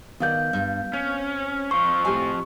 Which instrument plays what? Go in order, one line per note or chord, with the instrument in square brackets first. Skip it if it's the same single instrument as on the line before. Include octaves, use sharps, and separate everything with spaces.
[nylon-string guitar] D#3 D5 F#5 [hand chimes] B3 F5 G6
[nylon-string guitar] G2
[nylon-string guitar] C4 [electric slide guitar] C#4
[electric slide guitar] F2 F3 C5 [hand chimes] C#6
[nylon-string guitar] A2 G4 G#5